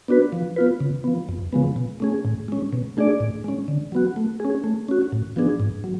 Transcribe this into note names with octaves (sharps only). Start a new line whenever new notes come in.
B3 D4 F#4 B4
F3
B3 F4 B4
C#3
F3 B3
F2
C#3 F3 G#3 B3
B2
A3 C#4 G#4
A2
G#3 C#4
B2
A3 D4 G#4 D5
A2
G#3 C#4
D3
F#3 B3 F#4
A3
C#4 G#4
A3
C#4 F#4
A2
F3 B3 D4 G#4
G#2
F#3